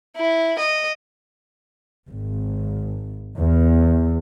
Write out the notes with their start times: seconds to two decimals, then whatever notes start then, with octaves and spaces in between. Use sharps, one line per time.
0.17 E4
0.59 D#5
2.10 G#1
3.39 E2